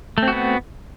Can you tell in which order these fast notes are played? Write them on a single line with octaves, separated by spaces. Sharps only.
A3 C4 F#4 B3